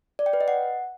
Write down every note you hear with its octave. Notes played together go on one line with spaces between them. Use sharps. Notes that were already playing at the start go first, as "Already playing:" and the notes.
D5
G5
B4
D#5
F#5